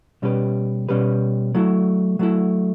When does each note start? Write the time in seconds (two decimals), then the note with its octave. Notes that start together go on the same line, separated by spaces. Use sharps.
0.22 B2 G3 C#4 G4 B4
0.88 B2 G3 C#4 G4 B4
1.55 F#3 A3 E4
2.19 F#3 A3 E4